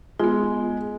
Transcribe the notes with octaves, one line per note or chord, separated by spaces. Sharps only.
G#3 B3 F4